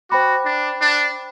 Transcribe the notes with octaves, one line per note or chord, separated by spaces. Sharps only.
F#4 C5 G5 B5 D6
D4
D4